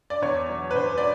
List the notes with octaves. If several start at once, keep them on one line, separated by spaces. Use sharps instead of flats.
D5
E2 C#5
B2 F#3
B4
E2 C5
D5